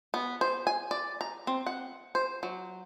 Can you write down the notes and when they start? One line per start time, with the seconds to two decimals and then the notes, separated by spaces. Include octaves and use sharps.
0.14 B3
0.41 C5
0.67 G#5
0.91 D5
1.21 A#5
1.47 C4
1.66 F#5
2.15 C5
2.43 F#3